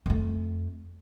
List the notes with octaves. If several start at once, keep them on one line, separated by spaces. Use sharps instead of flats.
F2 A3